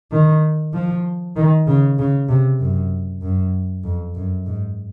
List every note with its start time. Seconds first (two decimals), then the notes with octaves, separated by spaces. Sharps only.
0.11 D#3
0.73 F3
1.36 D#3
1.66 C#3
1.98 C#3
2.28 C3
2.59 F#2
3.22 F#2
3.83 F2
4.15 F#2
4.46 G#2